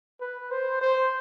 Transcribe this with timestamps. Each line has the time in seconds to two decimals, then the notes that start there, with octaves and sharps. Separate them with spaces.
0.21 B4
0.51 C5
0.81 C5